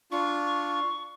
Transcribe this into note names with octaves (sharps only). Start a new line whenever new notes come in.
D4 F4 C#6